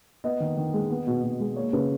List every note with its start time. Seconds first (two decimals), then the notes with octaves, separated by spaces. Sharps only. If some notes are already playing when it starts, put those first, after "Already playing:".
0.24 B3 D#5
0.40 D#3
0.57 D#3
0.74 G#3
0.90 B3
1.07 B2
1.23 B2
1.40 G#3
1.56 A#3 C#5
1.73 C#3 B4